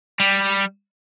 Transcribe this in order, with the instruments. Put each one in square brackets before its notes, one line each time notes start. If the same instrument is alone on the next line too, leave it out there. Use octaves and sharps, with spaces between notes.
[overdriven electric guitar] G3